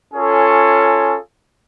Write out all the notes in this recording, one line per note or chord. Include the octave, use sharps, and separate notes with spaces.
C#4 F4 G#4 A4 C#5 G#5